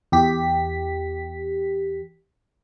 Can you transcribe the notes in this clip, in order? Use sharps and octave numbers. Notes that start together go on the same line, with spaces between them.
E2 G4 B6